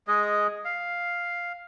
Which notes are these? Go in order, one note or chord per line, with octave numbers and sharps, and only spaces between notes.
G#3 G#4 D#5
F5